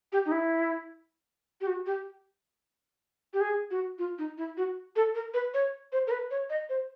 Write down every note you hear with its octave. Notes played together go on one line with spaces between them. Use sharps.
G4
D#4
E4
G4
F#4
G4
G4
G#4
F#4
F4
D#4
E4
F#4
A4
A#4
B4
C#5
C5
A#4
B4
C#5
D#5
C5